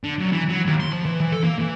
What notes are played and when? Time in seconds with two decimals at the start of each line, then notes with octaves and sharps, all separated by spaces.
0.04 D3
0.19 F#2
0.32 E3
0.49 F#3
0.66 D#2
0.80 C6
0.92 F3
1.05 E3
1.20 E3
1.32 A4
1.44 A#3
1.59 E3